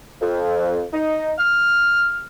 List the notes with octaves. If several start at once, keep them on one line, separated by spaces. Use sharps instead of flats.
F2
D#4
F6